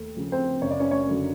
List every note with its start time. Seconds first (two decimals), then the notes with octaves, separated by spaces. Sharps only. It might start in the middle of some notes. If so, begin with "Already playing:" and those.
Already playing: D#2 A3
0.17 C#3 F3
0.32 C4 C5
0.62 F#1 C#5
0.71 D5
0.80 C#4 C#5
0.91 C#4 C#5
1.07 F#2 D3 F#3